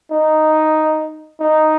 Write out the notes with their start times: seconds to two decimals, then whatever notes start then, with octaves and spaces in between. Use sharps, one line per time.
0.11 D#4
1.40 D#4